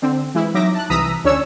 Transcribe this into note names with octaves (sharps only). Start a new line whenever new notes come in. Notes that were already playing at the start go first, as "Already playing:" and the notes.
D3 C4
E3 G#3 E4
F#3 D#4 E5 D6 A#6
A5 F#6
C2 E3 A#5 D#6 E6 B6
D2 C#4 D4 C#5 E6